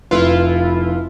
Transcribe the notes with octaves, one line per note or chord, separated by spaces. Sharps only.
F1 E4 F4 B4